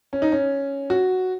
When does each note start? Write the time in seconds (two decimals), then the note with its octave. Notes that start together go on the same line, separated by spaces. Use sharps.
0.13 C#4
0.22 D#4
0.32 C#4
0.90 F#4